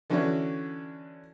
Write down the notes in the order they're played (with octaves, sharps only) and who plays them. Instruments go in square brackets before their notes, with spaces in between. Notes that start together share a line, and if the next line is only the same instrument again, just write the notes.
[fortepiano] D3 E3 C#4 D4 F#4